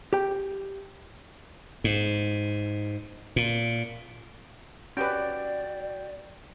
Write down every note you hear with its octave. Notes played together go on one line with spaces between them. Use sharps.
G4 G5
G#2
A#2
C#4 F#4 G4 B4 D5 G5